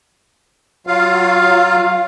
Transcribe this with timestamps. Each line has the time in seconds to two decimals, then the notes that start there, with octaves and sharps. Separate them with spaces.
0.87 F#3 F4 F5